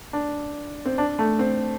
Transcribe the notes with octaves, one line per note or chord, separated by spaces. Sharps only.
D4
C4
D4
A3
C4